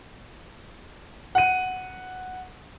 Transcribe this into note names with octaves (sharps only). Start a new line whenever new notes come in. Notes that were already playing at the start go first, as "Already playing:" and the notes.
F#5 D#7